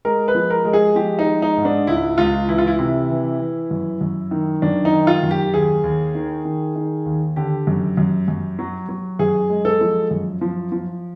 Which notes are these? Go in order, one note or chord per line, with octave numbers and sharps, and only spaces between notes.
G#3 A#4
B4
F3
A#4
G#3
G#4
F3 G4
D#4
G#3
D#4
G#2
D4
C#2 E4
C#2 F4
E3 E4
F4
E4
C3 E4
E3
E3
F#2
F#2
D#3
F#2 D4
D#4
D#3
F4
F#2
G4
D#2 G#4
D#2
D#3
D#3
D#3
D#2
D3 G4
F#2
F#2
F#2
F#3
F#3
F#2 G#4
G#3
A4
F3
F#2
F3
F3